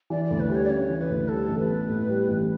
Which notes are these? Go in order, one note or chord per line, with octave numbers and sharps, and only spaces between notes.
E3 D5
D5
D2
B4
G3
C#5
D5
C#3 C#5
E3
B4
D2
G3 A4
A1
B4
B3
A2
G3
A1